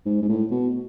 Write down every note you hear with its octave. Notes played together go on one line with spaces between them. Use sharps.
G#2
G#2
A2
B2